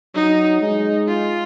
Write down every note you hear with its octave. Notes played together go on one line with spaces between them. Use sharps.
F#3 D#4
G#3 D#4
F4